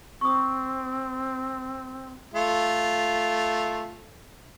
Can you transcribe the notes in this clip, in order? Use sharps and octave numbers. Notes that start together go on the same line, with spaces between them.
C4 C#6 D#6
A3 F4